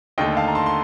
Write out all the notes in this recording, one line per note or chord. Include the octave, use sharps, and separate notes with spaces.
D#2 D3 A3 D#5 G5
F5 A5
A#5
A5 C6
C6